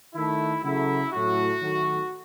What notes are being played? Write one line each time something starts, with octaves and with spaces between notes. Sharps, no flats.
D#3 A3 E4
C#3 F#3 A3 E4
A2 F#3 A3 F#4
D#3 F#3 A3